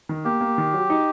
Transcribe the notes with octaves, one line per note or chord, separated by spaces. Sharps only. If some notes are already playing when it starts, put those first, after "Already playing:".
D#3
A#3 G4
A#3
D#3
F#3
D#4